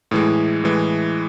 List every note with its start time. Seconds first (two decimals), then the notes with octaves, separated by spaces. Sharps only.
0.11 A2 E3 G#3
0.64 A2 E3 G#3